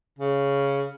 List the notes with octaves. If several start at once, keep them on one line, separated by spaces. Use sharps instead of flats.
C#3